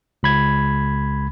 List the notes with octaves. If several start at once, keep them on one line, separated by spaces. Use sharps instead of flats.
C#2 B5 G#6